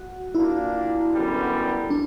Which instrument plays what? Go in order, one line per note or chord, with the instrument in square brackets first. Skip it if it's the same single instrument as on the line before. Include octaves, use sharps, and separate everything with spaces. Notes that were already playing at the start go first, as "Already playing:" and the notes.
Already playing: [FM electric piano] F#4
[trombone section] A#2 A#3 D4 [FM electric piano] E4
[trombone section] F#2 D3 G3 B3
[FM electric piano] D4